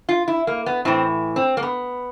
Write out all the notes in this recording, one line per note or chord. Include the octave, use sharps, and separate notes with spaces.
F4
E4
A#3
B3
A2 E3 C4
C4
A#3
B3